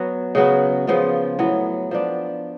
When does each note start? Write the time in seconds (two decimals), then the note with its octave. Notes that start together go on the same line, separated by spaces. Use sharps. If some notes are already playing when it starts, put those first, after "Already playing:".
Already playing: F#3 B3 F#4
0.35 C#3 F#3 B3 F#4
0.87 C#3 F3 B3 F4
1.39 A2 F#3 B3
1.91 F3 B3 D4